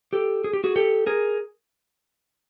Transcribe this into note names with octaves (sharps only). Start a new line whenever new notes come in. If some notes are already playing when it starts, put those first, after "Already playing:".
G4 A4
G#4
G4
F#4 G#4
G4 A4
G#4 A#4